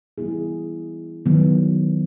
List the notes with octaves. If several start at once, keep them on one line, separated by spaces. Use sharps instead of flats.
E3 G3 B3 E4 G#4
D#3 F#3 B3